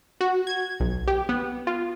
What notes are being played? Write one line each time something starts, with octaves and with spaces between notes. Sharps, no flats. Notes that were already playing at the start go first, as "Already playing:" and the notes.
F#4
G#6
B1
G4
B3
F4